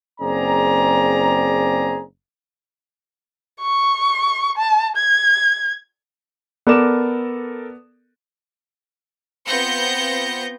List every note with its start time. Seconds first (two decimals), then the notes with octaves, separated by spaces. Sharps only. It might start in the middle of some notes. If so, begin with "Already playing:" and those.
0.21 F#1 C4 G#4 D5 A#5
3.62 C#6
4.57 A5
4.97 G#6
6.67 B3 A4 A#4 D5 D6 E7
9.46 B3 C4 F4 G6 A#6 C#7